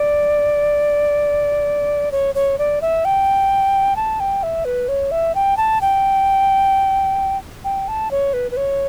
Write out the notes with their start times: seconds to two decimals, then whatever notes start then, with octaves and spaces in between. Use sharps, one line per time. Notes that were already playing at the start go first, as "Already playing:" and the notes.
Already playing: D5
2.12 C#5
2.35 C#5
2.59 D5
2.81 E5
3.05 G5
3.96 A5
4.20 G5
4.43 E5
4.65 B4
4.88 C#5
5.11 E5
5.35 G5
5.57 A5
5.81 G5
7.64 G5
7.88 A5
8.11 C#5
8.33 B4
8.51 B4
8.57 C#5